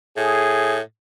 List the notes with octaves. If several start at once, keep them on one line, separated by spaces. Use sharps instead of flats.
A2 G#4